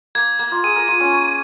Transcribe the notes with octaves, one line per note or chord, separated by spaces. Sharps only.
A#3 G#6
A#3 G#6
F4
G#4 D#7
A#4
F4 D#7
C#4
A#3 C#6